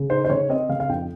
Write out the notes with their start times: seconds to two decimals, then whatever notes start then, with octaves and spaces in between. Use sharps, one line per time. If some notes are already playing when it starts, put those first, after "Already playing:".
Already playing: C#3
0.10 D#4 C5
0.25 C5
0.29 C#3 C#5
0.49 C4 D#5
0.69 C#3 F5
0.80 F5
0.89 F2 G5